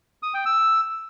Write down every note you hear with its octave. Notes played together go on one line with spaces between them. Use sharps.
D#6
G5
E6